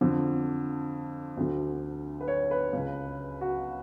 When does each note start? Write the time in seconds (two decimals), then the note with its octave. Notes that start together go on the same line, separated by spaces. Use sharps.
0.01 F2 D3
1.37 D2 D3
2.21 B4
2.28 C#5
2.51 B4
2.73 C#2 C#3
3.41 F#4